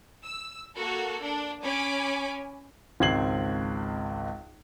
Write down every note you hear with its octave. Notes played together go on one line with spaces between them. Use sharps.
E6
A#3 F#4 A4
D4
C#4 G#5 B5 D6
G#1 C#2 C4 G#6 C7 F#7